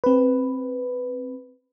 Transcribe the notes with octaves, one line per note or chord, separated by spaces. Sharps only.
C4 B4